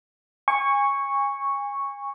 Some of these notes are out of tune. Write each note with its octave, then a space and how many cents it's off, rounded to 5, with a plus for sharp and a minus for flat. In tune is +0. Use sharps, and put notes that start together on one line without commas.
G#5 -30 C#6 +0